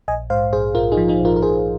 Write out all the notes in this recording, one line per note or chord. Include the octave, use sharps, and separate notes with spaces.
A#1 D#5 G#5
G#2 C5 F5
A#1 G#4 C5
A#1 F4 A#4
D#4 G#4
F3
D#4 G#4
A#1
F4 A#4
A#4
A#1 G#4 C5